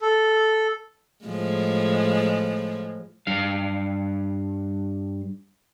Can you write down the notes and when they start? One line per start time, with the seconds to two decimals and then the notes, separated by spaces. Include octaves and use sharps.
0.01 A4
1.25 A2 F3 G#3
3.27 G2 F5